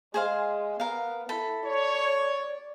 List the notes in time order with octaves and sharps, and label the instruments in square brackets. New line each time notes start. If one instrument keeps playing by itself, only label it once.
[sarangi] G#3 [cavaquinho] G#4 C5 F5
[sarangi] B3 [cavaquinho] A#4 F5
[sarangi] E4 [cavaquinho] A4 B5
[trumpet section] C#5 [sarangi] D5